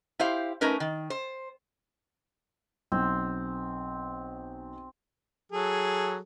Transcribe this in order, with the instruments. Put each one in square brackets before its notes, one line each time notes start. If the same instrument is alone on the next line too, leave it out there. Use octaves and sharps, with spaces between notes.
[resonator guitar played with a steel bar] E4 G4 C5 F5
A3 C#4 D#4 A#4 B4
D#3
C5
[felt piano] B1 [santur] C4
[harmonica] F#3 G#4 A4